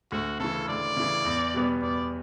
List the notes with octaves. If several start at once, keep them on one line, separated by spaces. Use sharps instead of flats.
D2 F#4
C#3 E3 A4
D2 D5
C#3 E3
E2
B2 G3 B3
E2 D5